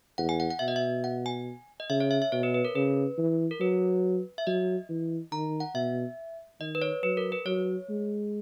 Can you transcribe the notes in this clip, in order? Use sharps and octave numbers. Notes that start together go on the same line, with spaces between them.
E2 F#5
G#5
F#5
F#5
B2 E5
D#5
E5
F#5
G#5
D#5
C#3 E5
C#5
E5
E5
B2 C#5
B4
B4
A#4
C#3 B4
E3
A#4
F#3 B4
E5
F#3 D#5
E3
D#3 A#5
F#5
B2 E5
D#3 D#5
B4
C#5
F#3 B4
A#4
B4
F#3 C#5
G#3